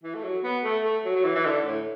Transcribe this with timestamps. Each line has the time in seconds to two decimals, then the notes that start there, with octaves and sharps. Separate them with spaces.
0.03 E3
0.14 A3
0.23 F#3
0.43 B3
0.63 A3
0.84 A3
1.05 F#3
1.16 F#3
1.25 E3
1.35 E3
1.45 D3
1.65 A2